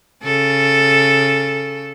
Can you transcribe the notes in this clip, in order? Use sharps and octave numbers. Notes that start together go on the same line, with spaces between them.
C#3 A4